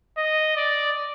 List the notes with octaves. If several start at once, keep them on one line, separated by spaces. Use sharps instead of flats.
D#5
D5